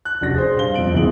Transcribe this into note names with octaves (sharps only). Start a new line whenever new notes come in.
F#6
F1 D4 F#4 A#6
G#4 C5
G2 C5 F5 G7
F2 C4 D7 F#7
F#1 D2 B2 E3 G#4 F#7